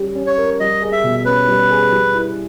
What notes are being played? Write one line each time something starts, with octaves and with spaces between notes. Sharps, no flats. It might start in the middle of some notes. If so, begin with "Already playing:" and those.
Already playing: G3 C#4 G4
C#4
C#5
A#4
G3 D#5
G#4
E5
B2
C#4 B4
G3
G#4
G3
E4